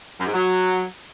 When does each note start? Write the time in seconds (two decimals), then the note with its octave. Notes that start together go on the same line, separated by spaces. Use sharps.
0.18 F#2
0.26 G#2
0.33 F#3